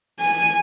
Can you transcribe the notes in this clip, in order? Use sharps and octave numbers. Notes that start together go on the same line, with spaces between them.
G#5